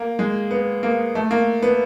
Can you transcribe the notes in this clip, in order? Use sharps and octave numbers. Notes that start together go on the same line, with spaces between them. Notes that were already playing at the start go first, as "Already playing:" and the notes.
Already playing: A#3
G#3
B3
A#3
A3
A#3
B3